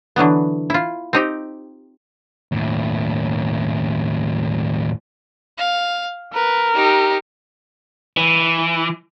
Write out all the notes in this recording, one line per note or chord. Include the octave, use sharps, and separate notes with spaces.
D3 E3 F#3 B3
E4 F4
C4 D#4 G4
D#2 A2
F5
A#4 B4
D#4 G4
E3